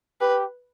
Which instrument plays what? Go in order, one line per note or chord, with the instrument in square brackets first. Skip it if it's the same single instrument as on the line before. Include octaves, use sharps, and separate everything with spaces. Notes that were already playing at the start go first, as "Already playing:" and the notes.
[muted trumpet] G4 [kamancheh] B4